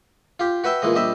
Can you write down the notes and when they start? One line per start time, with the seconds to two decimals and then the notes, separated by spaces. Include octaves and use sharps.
0.40 F4 G4
0.64 F#4 B4 E5 G5
0.82 A#2 E3 G#3 D#5
0.96 A#1 G3 D#5 E5